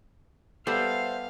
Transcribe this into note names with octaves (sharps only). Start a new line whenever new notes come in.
G3 B3 G4 A4 C5 E5 F5